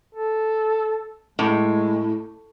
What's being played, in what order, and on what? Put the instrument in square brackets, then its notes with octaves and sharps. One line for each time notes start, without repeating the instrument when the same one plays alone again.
[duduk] A4
[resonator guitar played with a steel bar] A2 [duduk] G#3